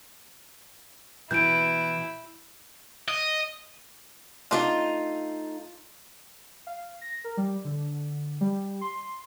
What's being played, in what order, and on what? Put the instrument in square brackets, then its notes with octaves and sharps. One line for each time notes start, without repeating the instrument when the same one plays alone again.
[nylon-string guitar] B2 E3 [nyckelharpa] E4 [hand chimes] G6 D7
[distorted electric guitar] D#5
[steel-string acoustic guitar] A3 D#4 F5 [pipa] D4 F4
[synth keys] F5
A#6
A#4
G3
D3
G3
C6